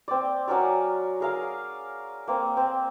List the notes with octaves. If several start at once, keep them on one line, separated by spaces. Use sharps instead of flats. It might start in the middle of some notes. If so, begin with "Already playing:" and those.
C4 D5
F#3 C#4 A#4 D5
G#4 A#4 F5
A#3 C4
C4